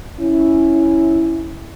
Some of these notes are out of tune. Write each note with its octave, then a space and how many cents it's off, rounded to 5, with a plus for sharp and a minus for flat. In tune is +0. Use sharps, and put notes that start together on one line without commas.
C#4 +0 E4 -5